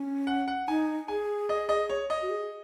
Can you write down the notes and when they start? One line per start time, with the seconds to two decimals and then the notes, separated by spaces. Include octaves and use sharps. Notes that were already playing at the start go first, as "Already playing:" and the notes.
Already playing: C#4
0.27 F#5
0.48 F#5
0.68 D#4 G#5
1.08 G#4 G#5
1.49 D#5
1.69 D#5
1.89 C#5
2.10 D#5
2.22 F#4
2.30 G#4